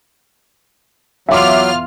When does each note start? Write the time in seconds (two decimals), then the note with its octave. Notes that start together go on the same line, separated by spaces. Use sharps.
1.29 E2 F#3 F4 E5 D6 F6